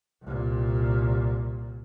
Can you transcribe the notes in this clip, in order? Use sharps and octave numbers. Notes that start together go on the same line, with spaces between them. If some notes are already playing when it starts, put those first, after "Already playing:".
C2 A#2